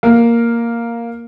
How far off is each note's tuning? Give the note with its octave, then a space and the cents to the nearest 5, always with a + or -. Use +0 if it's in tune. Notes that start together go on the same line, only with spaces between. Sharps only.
A#3 +0 A#4 +0